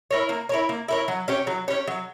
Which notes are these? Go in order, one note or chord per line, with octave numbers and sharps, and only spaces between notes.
E4 A#4 C#5
A#3
E4 A#4 C#5
A#3
E4 A#4 C#5
F#3
C#4 G4 C#5
F#3
C#4 G4 C#5
F#3